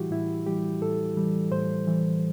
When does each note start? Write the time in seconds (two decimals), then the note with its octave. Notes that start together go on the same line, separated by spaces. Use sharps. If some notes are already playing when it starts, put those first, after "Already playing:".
Already playing: A2 E3 G3 E4 F#4 G4
0.11 A2 E4
0.47 E3 G3 G4
0.82 A2 A4
1.17 E3 G3
1.51 A2 C5
1.87 E3 G3